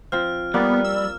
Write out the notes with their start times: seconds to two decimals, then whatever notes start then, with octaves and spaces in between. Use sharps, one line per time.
0.12 F3 C4 C5 F6
0.54 G3 A#3 B3 D5
0.84 E6